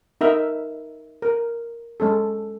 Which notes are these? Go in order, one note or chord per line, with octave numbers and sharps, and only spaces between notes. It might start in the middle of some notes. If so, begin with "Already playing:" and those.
D#4 A#4 E5
A#4
G#3 C#4 A4